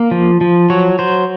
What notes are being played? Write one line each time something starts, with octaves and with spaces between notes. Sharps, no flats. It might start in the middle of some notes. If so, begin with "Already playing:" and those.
Already playing: A#3
F3
F3
F#3 C#5
F#3 C5